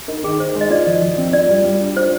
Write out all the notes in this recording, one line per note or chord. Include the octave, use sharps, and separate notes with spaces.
D#4 A#4
D#3 G#4
D#3 C5
G#3
D#5
F4 D5
F3
F3
C4
F4 D5
G3
G3
D4
F4 C5